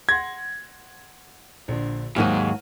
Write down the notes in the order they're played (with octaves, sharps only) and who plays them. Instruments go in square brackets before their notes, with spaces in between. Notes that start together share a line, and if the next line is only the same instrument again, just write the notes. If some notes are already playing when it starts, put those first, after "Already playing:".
[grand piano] F#5 C6 A#6 [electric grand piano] G#6
[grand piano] A#1 D3
[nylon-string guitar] D#2 F#3 F#4 [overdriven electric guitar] G#2 [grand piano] F6 D#7